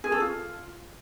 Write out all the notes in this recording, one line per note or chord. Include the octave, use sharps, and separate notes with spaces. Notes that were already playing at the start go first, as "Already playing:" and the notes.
G#4
A4
F4